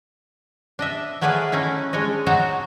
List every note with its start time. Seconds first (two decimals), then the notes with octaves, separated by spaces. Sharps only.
0.79 D4 D#5 E5
1.21 F#3 A3 G#4 B4 D5 F5
1.52 A3 C#4 D#4 E4
1.93 G#3 D4 C#5 D#5
2.26 F#3 D#4 F#4 A5 A#5